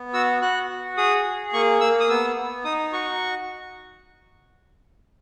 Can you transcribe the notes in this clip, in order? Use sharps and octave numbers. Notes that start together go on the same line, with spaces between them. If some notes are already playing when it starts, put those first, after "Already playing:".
Already playing: B3
F#4 E6
F#4 F#6
F#4
G#4 D#6
G#4
A#3 C#6
A#3 E6
D#6
B3 E6
B3
D#4 D#6
F#4 C#6